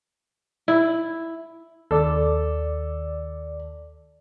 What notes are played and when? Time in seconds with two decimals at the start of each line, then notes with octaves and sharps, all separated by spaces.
0.68 E4
1.91 D#2 A4 D5